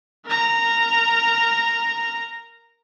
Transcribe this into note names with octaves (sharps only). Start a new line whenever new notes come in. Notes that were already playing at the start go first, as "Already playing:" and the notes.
A#4 A#5